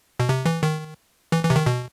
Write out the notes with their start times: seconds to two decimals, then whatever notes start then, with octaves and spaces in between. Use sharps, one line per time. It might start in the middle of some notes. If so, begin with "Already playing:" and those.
0.20 B2
0.29 C3
0.45 E3
0.63 D#3
1.32 E3
1.44 E3
1.50 C3
1.55 D#3
1.66 B2